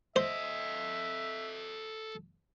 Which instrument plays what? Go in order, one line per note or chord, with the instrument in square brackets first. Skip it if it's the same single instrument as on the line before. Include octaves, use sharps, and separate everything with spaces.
[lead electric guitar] A4 D#5 [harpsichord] C5 [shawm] E5